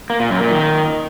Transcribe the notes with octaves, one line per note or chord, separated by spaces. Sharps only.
A#3
A#2
F#2
A#2
D#3